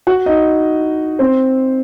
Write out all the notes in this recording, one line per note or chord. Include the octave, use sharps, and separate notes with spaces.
F#4 F#5
D#4 D#5
C4 C5